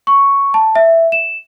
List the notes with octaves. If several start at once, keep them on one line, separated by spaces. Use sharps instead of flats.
C#6
A5
E5
E7